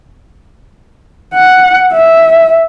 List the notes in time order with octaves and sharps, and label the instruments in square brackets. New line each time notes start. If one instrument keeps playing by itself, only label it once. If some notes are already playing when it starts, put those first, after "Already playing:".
[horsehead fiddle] F#5
E5